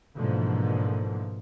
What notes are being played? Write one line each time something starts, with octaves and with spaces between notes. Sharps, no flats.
G#2 B2 D3 E3 F3 A#3